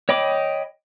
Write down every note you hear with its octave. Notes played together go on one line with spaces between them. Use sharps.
C#5 D#5 G5 B5 D6